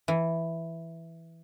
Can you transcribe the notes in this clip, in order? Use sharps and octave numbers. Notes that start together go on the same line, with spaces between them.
E3